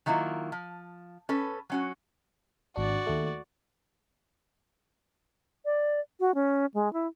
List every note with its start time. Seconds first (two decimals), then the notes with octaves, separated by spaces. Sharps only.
0.06 D#3 F#3 A#3 E4 F4
0.52 F3
1.29 C#4 A4 B4
1.70 F#3 C#4 F#4
2.76 G#1 D4 F#4 D5
3.07 D#2 A3
5.65 D5
6.20 F#4
6.34 C#4
6.74 G#3
6.93 E4